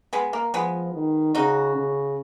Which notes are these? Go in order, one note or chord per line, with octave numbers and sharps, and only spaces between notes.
G#3 B3
A#3
F3 G#3 B3
D#3
C#3 D#4 F#4
C#3